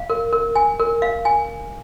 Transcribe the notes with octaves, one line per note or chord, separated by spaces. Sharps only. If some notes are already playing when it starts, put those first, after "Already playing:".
Already playing: F5
A#4
A#4
G#5
A#4
F5
G#5